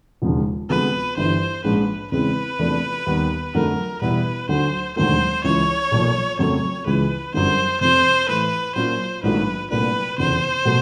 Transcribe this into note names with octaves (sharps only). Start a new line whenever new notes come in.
E1 D#2 C#3 F3 G#3
D2 C3 F3 G#3 B3 B4
G1 G2 E3 G3 C5
A#1 G#2 F3 G#3 C#4 B4
E2 C#3 E3 G#3 C4 B4
E2 C3 F3 A3 D4
D#2 D#3 G3 B3
F2 D3 F#3 A3 A#4
E2 B2 G3 B3 E4 B4
D2 D3 F#3 C5
E1 D#2 D3 F#3 A3 C5
C#2 C#3 E3 C#5
B1 A#2 F3
F2 C#3 F#3 A3 C4 C#5
C#2 C#3 E3 G#3 B4
G1 F#2 D3 G3 C5
F1 F2 C3 C5
A2 E3 A3 B4
A#2 F#3 A#3 C#4 F4 C5
A#1 G#2 D#3 F#3 A3 B4
C2 A#2 F#3 A3 D4 B4
F1 E2 C#3 C5
B2 F#3 A3